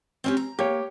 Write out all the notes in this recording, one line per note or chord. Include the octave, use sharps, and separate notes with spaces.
C4 C#4 G4
A#5
A#3 G4 C#5